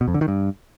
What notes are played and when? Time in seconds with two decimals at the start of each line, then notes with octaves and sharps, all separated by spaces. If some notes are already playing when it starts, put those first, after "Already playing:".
0.01 B2
0.08 F2
0.14 D3
0.21 D#3
0.28 G2